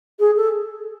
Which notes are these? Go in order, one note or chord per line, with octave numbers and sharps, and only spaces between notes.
G#4
A4